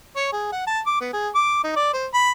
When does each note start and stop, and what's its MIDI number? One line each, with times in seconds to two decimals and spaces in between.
0.16 0.29 73
0.33 0.49 68
0.52 0.65 78
0.67 0.80 81
0.86 1.01 86
1.01 1.12 59
1.13 1.29 68
1.35 1.61 86
1.64 1.75 63
1.76 1.89 74
1.93 2.07 72
2.14 2.31 83